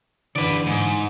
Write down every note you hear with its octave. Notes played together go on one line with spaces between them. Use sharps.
D3 E3 B4 D5
G#2